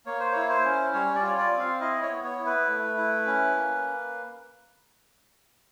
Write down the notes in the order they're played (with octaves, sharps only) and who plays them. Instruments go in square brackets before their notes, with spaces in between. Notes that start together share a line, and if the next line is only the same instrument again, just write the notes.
[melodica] A#3 C#5
C5
E4 C#5
C5
C#4
G3 C#5
D5
F4
C#5
D5
C4
F5
E4 D#5
C#5
B3
C#5
E4
B4
A3
E4
C#4
A#3